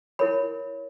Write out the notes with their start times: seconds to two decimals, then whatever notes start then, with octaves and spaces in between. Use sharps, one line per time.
0.19 E4 A#4 C#5 B5